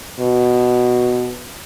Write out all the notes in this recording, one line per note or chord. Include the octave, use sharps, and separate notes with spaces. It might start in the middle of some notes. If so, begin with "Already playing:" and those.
B2